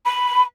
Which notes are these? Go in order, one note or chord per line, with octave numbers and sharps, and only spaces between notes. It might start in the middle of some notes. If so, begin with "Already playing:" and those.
B5